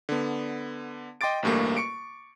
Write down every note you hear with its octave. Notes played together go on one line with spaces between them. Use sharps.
D3 B3
D#5 G5 C6 D6 A6 D7
A1 D2 G2 A3 A#3
C#6 C#7 D7